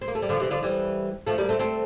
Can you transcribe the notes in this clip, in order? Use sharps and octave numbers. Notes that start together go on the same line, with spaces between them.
C4
A#3
A3
G3
D3 F3
C3 E3
D3 F3
E3 G3
F3 A3
G3 A#3
A3 C4
A3 C4